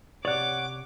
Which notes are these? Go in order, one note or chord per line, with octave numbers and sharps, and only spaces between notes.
C3 C#5 D5 F#5 D6